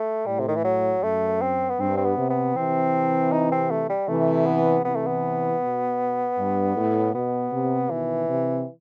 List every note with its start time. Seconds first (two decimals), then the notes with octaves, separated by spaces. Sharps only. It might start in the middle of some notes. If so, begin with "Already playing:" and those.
Already playing: A3
0.26 A2 G3
0.39 C3
0.48 D#3
0.56 E3
0.65 F#3
1.03 F#2 A3
1.42 C4
1.70 B3
1.79 G2 C4
1.97 C4
2.05 B3
2.18 C3
2.30 B3
2.55 C3 E3 C4
3.32 D#4
3.52 C4
3.71 A3
3.89 G3
4.08 C3 E3 A3
4.46 B3
4.85 C3 E3 B3
4.96 A3
5.07 B3
5.62 B2
6.38 G2
6.76 A2
7.14 B2 B3
7.53 C3
7.91 B2 D#3 E3
8.29 C3